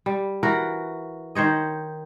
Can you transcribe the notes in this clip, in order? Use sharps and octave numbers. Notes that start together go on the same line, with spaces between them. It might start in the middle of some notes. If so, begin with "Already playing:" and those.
G3
E3 F#4 A#4
D#3 C5 C#5 D#5